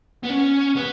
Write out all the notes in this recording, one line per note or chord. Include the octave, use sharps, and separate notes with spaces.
B3
C#4
B3